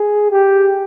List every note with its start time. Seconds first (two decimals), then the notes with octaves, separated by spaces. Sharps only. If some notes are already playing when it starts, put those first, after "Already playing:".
Already playing: G#4
0.31 G4